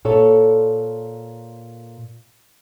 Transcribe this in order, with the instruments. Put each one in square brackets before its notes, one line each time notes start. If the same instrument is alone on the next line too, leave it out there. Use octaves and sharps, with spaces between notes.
[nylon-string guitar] A#2 A4 C#5